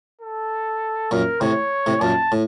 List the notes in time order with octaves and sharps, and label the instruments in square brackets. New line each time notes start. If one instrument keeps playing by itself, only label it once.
[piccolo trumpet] A4
[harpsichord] F#2 A#2 [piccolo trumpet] A#4
[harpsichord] A2 C3 [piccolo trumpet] C#5
[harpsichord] A2 C3
[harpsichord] F#2 A#2 [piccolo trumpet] A5
[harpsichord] A2